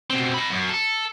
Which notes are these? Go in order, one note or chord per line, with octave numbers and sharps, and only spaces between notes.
B2 C4
D#5 B5
F#2
A4